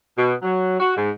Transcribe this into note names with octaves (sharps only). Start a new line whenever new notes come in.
B2
F#3
F#4
G#2